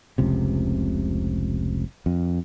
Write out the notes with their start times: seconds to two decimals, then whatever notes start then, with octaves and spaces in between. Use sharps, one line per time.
0.18 F1 C#2 C3
2.06 F2